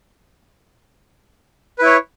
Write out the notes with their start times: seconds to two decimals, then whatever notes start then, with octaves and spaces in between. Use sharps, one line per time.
1.79 B4
1.82 E4
1.85 C#5